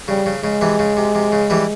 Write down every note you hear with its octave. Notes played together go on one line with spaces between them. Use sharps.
C#3 G3
C#3
C#3 G#3
C3 E3
C#3
C3
C3
C#3
E3 G3